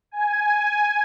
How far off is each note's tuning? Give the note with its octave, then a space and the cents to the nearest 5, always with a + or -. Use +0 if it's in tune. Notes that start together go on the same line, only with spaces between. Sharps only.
G#5 +5